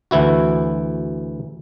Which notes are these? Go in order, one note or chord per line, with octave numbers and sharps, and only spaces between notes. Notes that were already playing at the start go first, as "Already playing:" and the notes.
D2 E3 E4 F#4